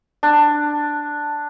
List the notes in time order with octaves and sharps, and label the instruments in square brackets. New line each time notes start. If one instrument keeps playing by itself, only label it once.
[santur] D4